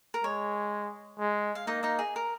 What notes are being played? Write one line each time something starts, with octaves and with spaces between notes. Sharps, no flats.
A#4
G#3 C#5
G#3
F5
A#3 D#4 D#5
D#4 D#5
G#4
A#4